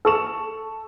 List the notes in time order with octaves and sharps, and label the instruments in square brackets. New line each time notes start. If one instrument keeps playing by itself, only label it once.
[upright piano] A4 C#6 E7